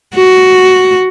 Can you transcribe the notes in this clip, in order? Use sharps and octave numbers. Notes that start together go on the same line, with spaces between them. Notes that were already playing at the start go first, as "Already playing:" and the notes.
F#4